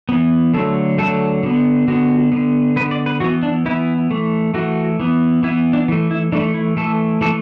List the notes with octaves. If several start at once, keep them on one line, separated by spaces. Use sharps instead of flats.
E3 B3
D3 F#3 A3 A4
D3 F#3 A3 A4
D3 B3
D3 B3 F#4
D3 B3
D3 B3 B4
D5
B4
E3 B3 F#4
D4
E3 B3 E4
E3 A3
E3 A3 F#4
E3 B3
E3 B3 E4
D4
E3 A3
E4
E3 A3 D4
E4
E3 A3 A4
E3 A4
A3